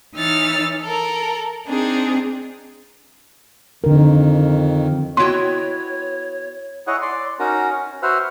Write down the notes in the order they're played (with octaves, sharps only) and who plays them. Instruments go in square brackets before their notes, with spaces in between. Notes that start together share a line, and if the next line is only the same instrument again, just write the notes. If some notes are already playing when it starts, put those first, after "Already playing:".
[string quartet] E3 D#4 C#5 E6 F6 A6
A4 A#4
C4 D4 D#4 G#4
[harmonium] F2 D#3 [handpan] D3 A#4
[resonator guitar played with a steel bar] B3 E4 G5 [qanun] F#4 D#5 [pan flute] C#5 [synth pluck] C6
[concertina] E4 G#4 C#5 D#5 F#5
D5 C6
C#4 D#4 F#4 A#4
C#4
F#4 B4 C5 E5 F#5 F6